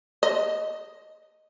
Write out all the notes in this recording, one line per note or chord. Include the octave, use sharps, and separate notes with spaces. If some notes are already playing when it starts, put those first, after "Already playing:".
D#5